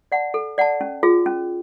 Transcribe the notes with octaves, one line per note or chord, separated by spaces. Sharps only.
D5 F#5 A5
A4
D5 F#5 A5
C#4
F4 G#4
C#4